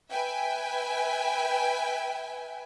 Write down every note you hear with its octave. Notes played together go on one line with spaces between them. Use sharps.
B4 E5 G5 G#5